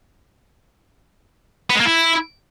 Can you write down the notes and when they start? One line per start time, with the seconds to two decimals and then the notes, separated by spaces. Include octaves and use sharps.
1.70 B3
1.75 G#3
1.80 A#3
1.85 E4